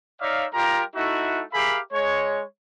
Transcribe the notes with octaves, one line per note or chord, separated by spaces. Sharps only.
D#4 C#5 D5 E5 F5
G3 F4 G4 A#4 A#5
A3 D#4 E4 F#4
G4 G#4 A#4 E5 F5 B5
G#3 C#5